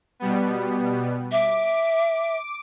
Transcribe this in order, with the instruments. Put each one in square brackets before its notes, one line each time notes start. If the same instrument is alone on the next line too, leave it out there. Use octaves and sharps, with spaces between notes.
[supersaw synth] B2 G3 B3
[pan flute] E5 [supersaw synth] D6 D7